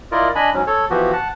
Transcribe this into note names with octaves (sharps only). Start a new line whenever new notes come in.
E4 F4 A#4 D5 D#5
D4 D#5 G#5 B5
G#2 F#3 C#4
A4 C#5
E3 F3 B3 F#4 G4
F#5 A5